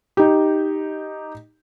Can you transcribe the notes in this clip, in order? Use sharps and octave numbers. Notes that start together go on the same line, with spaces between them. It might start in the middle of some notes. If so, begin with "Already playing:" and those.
D#4 G4